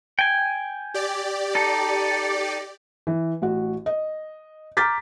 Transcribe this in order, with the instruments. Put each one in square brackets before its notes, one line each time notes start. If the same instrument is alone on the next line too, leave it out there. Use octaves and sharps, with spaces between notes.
[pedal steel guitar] G5 G#5
[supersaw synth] G4 D5
[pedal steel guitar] D#4 A4
[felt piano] E3
A1 F#4
D#5
A#5 D6 F6 G6 A6 B6